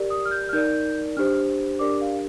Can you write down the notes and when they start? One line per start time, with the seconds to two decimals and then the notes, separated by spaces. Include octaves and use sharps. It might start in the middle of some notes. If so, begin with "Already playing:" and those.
Already playing: G4 A#4 D5
0.10 D#6
0.25 F6
0.31 G6
0.49 F6
0.53 D#4 A#4 D5 G6
1.17 D4 G4 C5 F6
1.79 D4 G4 A#4 D5 D6
2.01 F5